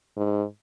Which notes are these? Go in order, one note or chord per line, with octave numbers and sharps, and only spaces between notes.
G#2